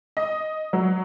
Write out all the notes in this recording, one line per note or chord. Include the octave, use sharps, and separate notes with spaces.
D#5
F#3